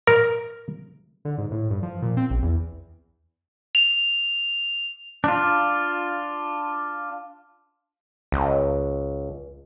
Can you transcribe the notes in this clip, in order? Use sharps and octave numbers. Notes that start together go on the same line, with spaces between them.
A#4
D3
G#2
A2
G2
F3
A#2
C4
A#1
E2
F7
D4 F4
C#2